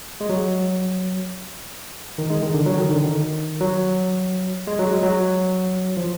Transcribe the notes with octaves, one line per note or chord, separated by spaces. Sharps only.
G#3
F#3
D#3
G#3
D#3
D3
F#3
D#3
D3
D#3
F#3
G#3
F#3
G#3
F#3
F3